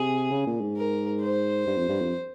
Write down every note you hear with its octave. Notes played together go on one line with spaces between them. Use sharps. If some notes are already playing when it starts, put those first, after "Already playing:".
Already playing: C3 G#4
C#3
A#2
G#2
A#4
C5
G2
F2
G2
F2